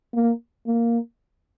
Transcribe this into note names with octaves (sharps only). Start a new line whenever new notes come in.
A#3
A#3